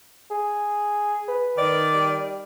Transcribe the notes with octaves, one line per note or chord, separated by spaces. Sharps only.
G#4
B4
D#3 D5
G3